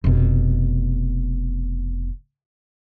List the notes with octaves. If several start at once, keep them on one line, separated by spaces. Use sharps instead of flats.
F1 B2